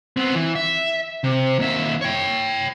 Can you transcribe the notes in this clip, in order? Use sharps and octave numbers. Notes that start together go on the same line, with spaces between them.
B3 C4
E3
E5
C3
D#2 E5
C#5 G5